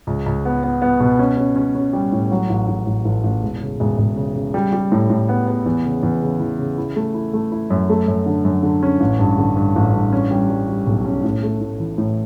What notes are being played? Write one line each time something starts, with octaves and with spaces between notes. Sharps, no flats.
C#2
C#2
B3
B3
B3
B2
C#4
C#4
C#4
C#4
G3
A2
F#3
A1
A1
A1
A1
A1
E1
C#3
E1
E1
C#3
C#3
G3
G3
A2
A2
B3
B3
E2
C#3
E2
C#3
E3
C#3
E4
A3
E4
A3
E4
F#2
A3
F#2
D3
F#2
D3
C#4
A1
G2
D3
G2
A1
G2
C#4
G3
G3
G3
B1
C#4
A2
A3
A2
E3
A2